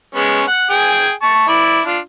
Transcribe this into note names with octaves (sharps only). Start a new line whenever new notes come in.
G#3 B3 C#4
F#5
G#4 G5 G#5
A5 C#6
E4 D5
D4 F4